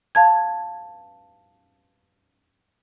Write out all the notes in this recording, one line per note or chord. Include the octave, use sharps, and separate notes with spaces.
F5 A5 G#6